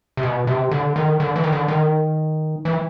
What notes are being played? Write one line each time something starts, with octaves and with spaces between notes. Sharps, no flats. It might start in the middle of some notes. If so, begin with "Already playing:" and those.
C3
B2
C3
D3
D#3
D3
E3
D#3
D3
D#3
E3